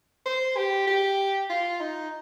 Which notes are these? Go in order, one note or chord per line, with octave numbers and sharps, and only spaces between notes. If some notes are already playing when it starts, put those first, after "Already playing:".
C5
G4
G4
F4
D#4